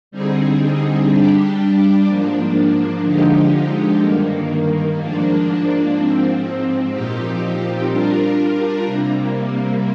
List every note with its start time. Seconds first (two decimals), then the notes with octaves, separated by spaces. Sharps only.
0.11 D3 G3 C4 D#4 G#4
1.08 G3 D4 G4
2.06 G#2 F3 A#3 D4
3.03 D3 F3 G#3 D#4 G4
4.00 G2 D#3 A#3
4.97 G#2 F3 A#3 D4
5.94 G#2 F3 C4
6.92 A#2 F3 C4 D#4 G4
7.88 G3 D4 F4 A#4
8.86 C3 G3 A#3